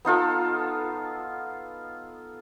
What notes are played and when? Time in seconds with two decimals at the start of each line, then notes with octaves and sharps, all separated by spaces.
0.05 B3 D#4 F4 A4